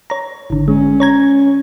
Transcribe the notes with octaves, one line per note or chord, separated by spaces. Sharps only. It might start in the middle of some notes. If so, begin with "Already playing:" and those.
C#5 A#5
G#1 D3
G#3 C#4
C#5 A#5 G#6